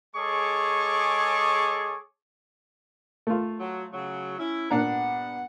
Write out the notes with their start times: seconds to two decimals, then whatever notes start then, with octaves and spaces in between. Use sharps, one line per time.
0.16 G#3 G#4 A4 C#5 C#6 D6
3.27 A3 F4
3.59 F#3
3.92 C#3 F#3
4.39 C#4 E4
4.71 G2 A#2 B3 D4 F#5 A#5